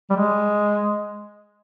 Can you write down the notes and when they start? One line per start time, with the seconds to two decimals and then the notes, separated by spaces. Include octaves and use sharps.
0.10 G3
0.16 G#3